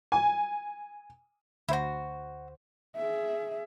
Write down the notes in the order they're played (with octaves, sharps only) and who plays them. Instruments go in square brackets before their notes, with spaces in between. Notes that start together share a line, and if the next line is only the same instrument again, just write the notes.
[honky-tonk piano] G#5
[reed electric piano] D2 C5 [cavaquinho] E4 F#4
[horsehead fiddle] G#4 E5